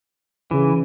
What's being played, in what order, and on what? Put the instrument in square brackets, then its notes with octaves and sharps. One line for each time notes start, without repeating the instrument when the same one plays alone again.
[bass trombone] C#3 [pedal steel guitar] E3